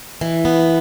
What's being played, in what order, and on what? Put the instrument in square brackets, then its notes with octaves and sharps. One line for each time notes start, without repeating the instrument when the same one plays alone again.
[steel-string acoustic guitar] E3
B3